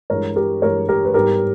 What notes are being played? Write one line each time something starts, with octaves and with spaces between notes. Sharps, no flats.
G2 E3 G#3 A#4 C#5
G4 A#4
G2 E3 G#3 A#4 C#5
G4 A#4
B4
G#2 G3 B3 G4 A#4